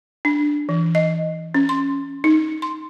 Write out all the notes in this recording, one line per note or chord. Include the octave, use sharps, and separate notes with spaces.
D4
E3
D#5
C#4
C6
D#4
C6